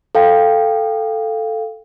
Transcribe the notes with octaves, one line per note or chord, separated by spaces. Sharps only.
A4 F5 G5